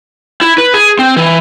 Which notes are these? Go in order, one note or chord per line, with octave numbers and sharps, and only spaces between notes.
E4
B4
G#4
C4
E3